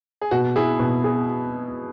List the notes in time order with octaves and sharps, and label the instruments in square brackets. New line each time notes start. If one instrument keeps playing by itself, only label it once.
[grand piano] G#4
[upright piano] B2 [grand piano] F#4
[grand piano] E4 [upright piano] G#4
[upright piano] B2
G#4